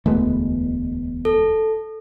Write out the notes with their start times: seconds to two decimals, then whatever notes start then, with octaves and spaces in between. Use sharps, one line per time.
0.06 E1 D2 E3 G#3 A3 B3
1.25 A4